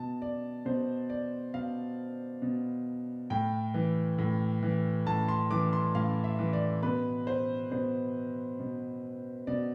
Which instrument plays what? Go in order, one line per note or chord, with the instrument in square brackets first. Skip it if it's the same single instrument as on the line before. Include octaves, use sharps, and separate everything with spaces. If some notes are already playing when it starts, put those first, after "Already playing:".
Already playing: [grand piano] B2 A5
D5
B2 C5
D5
B2 F5
B2
A2 G5
E3
A2
E3
A2 A5
C6
E3 D6
C6
A2 F5
E5
E3
D5
B2 B4
C5
B2 C5
B2
B2 D5